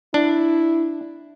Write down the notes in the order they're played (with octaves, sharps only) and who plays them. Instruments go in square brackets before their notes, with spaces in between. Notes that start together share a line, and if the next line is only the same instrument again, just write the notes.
[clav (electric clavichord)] D4 [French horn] E4